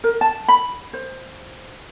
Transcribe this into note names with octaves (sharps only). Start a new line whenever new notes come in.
A#4
A5
B5
C5